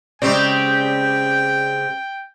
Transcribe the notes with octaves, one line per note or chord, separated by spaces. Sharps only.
C#3 G#3 C4 G4 D5 G5